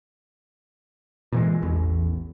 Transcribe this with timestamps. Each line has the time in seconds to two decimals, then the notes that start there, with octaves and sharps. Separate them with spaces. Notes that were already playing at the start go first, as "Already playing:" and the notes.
1.32 A#2 E3 G#3
1.62 A1 E2